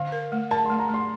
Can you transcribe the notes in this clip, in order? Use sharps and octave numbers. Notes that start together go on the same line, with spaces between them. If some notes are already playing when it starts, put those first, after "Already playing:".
Already playing: D3 F5
A#4
A3
A#4 A5
A3 C6
A#5
A3 C6